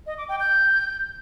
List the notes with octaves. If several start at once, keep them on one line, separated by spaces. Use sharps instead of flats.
D#5
D6
G5
G6